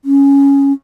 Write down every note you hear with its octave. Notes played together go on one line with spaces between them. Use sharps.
C#4